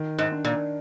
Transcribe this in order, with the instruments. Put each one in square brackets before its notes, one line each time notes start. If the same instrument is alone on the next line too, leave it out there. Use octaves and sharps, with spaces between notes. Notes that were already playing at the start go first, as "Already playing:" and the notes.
Already playing: [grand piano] D#3
[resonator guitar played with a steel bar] G#2
[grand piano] D4
[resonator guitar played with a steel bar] A#2